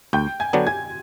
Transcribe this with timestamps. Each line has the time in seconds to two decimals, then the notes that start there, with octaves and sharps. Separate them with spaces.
0.13 D2 G5 G6
0.40 G#5 G#6
0.53 D3 F#3 B3 D4
0.67 G#5 G#6